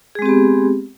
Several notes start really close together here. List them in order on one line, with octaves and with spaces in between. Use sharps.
G#4 G#3 C4 G4 B3